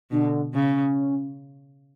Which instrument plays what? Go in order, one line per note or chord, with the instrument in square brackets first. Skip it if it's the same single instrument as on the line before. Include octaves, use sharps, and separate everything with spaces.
[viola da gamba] B2 [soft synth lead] D3
[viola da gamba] C#3 [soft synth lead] C#4